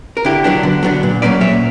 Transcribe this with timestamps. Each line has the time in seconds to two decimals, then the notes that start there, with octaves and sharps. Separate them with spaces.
0.17 A#4
0.25 D3 E4 G4
0.44 F#3 B3 D4
0.63 D3
0.83 F#3 B3 D4
1.03 A#2
1.22 F#3 A#3 C#4 B4 D5
1.41 A#2 C#5 E5